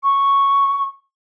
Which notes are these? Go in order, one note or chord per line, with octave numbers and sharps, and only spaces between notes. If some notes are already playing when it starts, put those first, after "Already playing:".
C#6